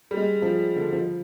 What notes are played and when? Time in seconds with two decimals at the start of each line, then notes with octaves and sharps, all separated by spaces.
0.11 G3
0.17 G#3
0.42 F3
0.76 D3
0.93 F3